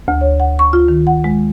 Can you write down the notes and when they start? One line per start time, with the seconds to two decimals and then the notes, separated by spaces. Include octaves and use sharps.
0.08 D2
0.21 C#5
0.40 F#5
0.59 C#6
0.73 F4
0.88 D#3
1.07 F#5
1.24 G#3